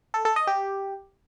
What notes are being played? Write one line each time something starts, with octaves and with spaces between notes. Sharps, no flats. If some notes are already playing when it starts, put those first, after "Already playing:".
A4
A4
D#5
G4